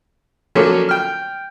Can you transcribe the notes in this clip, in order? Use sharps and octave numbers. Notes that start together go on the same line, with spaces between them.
D3 F3 F#3 A#3 C#4
G5 F6